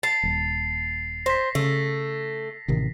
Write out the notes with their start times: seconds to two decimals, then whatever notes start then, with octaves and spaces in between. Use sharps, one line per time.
0.03 A5 A6 C7 F7
0.23 D#1
1.26 C5 A#6 B6
1.55 C#3 A3
2.68 A1 C3 D#3